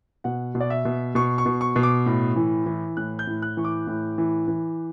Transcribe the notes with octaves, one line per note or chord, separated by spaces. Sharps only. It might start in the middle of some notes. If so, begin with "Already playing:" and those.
B2 F#5
B2
D5
E5
B2
B2 C#6
C#6
B2
C#6
B2
D6
A2
E3
E3
A2 F#6
G6
A2
F#6
E3 C#6
D6
A2
E3
E3